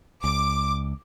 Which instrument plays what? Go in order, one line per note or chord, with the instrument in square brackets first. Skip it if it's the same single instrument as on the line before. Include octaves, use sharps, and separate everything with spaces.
[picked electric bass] C#2 [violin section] D6